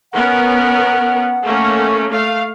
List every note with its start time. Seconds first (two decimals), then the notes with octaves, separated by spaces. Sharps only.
0.13 B3 C#4 A#4 F#5
1.43 A3 A#3 C#4
2.11 A3 F5